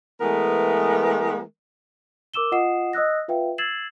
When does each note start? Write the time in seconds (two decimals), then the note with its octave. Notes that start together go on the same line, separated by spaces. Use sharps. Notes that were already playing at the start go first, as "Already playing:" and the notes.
0.21 E3 G#3 A3 B3 A#4
2.34 A#4 D6 E6 E7 G7
2.52 F4 D#5 F#5 D#6 C7 E7
2.93 D#5 D#6 E6 F#6 A#6
3.28 F4 B4 E5 F5 G5
3.58 E6 G#6 A6 C7 E7 F#7